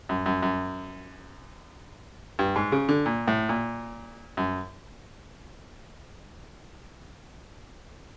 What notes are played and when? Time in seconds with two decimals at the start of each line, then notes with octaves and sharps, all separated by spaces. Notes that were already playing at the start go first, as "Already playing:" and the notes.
0.09 F#2
0.26 F#2
0.42 F#2
2.39 G2
2.56 G#2
2.72 C#3
2.89 D3
3.06 A#2
3.28 A2
3.49 A#2
4.37 F#2